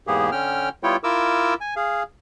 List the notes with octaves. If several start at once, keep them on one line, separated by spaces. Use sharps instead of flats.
E2 G#2 A#3 B3 G4 G#4
D3 C#4 G5 F6
G3 B3 E4 F4 C#5 G5
E4 F4 A#4 D6 E6
G#5
G#4 F5